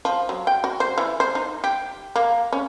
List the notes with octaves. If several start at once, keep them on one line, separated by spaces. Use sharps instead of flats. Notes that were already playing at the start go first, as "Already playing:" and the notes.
F3
F#3
G5
F#4
C5
E3
C5
D#4
G4
A#3
C#4